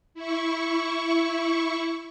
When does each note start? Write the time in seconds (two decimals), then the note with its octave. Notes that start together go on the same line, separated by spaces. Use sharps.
0.14 E4 C#6